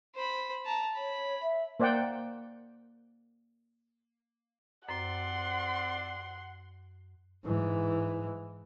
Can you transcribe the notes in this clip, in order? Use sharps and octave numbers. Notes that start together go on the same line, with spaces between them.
C5 B5
A5 A#5
C#5 B5
E5
A#3 C5 D5 F#5 G5
F#2 C4 C5 D5 F#5 C6
G#2 E3